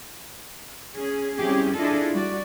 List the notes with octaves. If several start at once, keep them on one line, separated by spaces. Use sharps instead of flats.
C#4 G#4
G3 C4 C#4 E4 G4 G#4
D4 E4 F4 G#4 A4 D#5
G3 F#4 D5